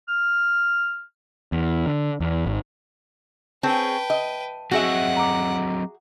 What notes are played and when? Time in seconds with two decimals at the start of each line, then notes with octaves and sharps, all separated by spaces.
0.08 F6
1.52 E2
1.86 D3
2.20 E2
2.46 G#1
3.63 C4 C#4 G#4 B4 G5 A5
4.10 D#5
4.71 F#3 C4 F#4 G#4 D#5 E5 F#5
5.17 A#5 D6